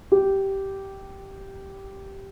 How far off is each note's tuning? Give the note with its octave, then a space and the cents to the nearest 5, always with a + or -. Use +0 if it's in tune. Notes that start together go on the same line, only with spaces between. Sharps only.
G4 -10